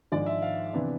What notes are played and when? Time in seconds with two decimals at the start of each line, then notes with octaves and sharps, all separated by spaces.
0.12 G#1 G#2 F3 G#3 D4 D5
0.26 E5
0.42 F5
0.73 C3 E3 B3 D4